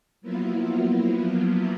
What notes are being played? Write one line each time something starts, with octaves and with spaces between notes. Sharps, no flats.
F3 F#3 A#3 B3 E4 F4